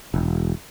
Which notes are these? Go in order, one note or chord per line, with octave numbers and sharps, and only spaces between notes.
E1